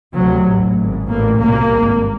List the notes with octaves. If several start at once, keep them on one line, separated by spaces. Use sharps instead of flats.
D2 C3 F#3
A1 A2
G#1 G#2
A1 A2 A#3
C2 B2 A#3
G#1 G2